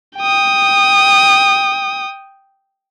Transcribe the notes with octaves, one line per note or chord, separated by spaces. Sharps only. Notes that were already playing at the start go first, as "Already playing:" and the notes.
G5 D#6